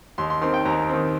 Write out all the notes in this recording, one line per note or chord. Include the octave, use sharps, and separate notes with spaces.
D#2 C6
C6
D#3 C4 C6
G5
D#2 A#5
D#3 C4